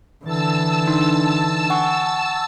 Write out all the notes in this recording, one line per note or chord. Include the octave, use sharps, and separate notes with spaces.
D3 E3 A5 E6
D4 D#4 C6
F#5 G#5 C#6